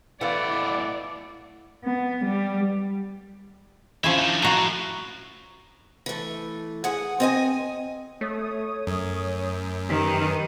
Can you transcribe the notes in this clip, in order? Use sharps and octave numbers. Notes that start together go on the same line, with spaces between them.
A2 E3 A3 B3 D5 F5 F#5
B3
G3
F3 C#4 E4 C5 E5
D4 D#4
A2 F#4 A#5
E3 A3
G#4 F#5
C4 D#5 G#5
A3 C#5 D#6
F#2
D#3 G4 B4 D#7